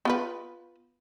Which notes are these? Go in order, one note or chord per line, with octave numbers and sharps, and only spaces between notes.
B3 F4 B4